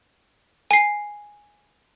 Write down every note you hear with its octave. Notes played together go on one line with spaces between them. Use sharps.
G#5 C7